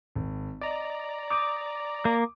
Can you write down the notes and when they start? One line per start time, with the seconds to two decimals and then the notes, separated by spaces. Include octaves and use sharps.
0.15 G#1
0.61 D5 D#5 A#5
1.30 D6 D#6 G6 D7
2.05 A#3